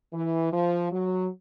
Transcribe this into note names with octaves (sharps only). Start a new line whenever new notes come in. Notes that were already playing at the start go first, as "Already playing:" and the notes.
E3
F3
F#3